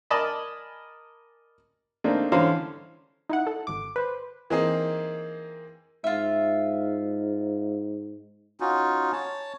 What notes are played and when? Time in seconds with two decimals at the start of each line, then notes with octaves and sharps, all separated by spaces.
0.11 A#4 D5 D#5 G#5 A5 B5
2.04 A3 A#3 C4 D4 D#4
2.32 D3 E3 C#4 C5 F5 A#5
3.30 D#4 E4 F#5
3.47 A4
3.67 G#1 D6
3.96 B4 C5
4.50 E3 A#3 C4 D#4 G#4
6.04 G#2 F4 E5
8.60 C#4 D#4 F4 F#4
9.13 C#5 A5